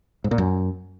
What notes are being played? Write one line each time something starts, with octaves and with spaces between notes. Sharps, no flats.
G#2
A#2
F#2